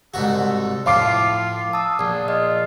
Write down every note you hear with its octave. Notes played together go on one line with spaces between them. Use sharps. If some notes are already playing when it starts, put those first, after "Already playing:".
C2 G#2 F#4 A4
A2 F3 F4 F5 D6 C7
A5 D#6 E6
A#1 G#4
F4 D#5